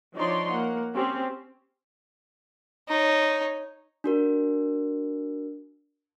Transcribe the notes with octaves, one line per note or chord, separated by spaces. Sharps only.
F3 D4 D#4 C#5 D5 C6
A#3 F#5
C4 C#4 G4
D#4 C#5
D4 F#4 A#4